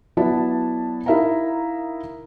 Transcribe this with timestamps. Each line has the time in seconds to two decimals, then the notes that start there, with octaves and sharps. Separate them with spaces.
0.17 F#3 B3 E4 F#4 D5 A5
1.06 D#4 E4 A#4 E5 F5 A#5